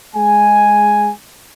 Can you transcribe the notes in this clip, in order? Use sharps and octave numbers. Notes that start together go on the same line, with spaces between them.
G#3 G#5